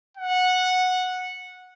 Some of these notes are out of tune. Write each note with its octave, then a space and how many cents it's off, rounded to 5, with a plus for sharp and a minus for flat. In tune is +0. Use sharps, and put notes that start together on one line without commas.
F#5 -10